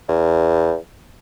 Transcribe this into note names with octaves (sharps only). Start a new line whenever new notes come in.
E2